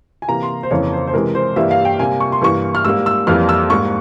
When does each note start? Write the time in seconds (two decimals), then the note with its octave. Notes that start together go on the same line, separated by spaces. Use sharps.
0.22 G#5
0.28 C3 E3 A#3 A#5
0.43 C6
0.63 C5
0.71 F2 C#3 E3 A#3 C#5
0.93 C5
1.07 C5
1.14 C3 E3 G#3 A#4
1.35 C5
1.56 G2 E3 G3 A#3 E5
1.71 F5
1.85 G5
1.99 C3 G3 A#3 G#5
2.20 C#6
2.32 C6
2.41 G2 E3 A#3 C#6
2.75 F6
2.85 G#2 G3 A#3 E6
3.06 E6
3.27 F2 E3 G3 A#3 F6
3.49 E6
3.70 G#2 G3 A#3 C#6